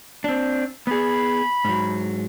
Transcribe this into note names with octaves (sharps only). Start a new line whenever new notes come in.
C4 D4
B3 G#4 B5
G#2 F#3